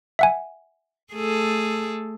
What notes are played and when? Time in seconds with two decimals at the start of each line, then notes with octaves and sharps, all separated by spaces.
0.19 E5 F#5 G#5
1.13 A3 G#4 A4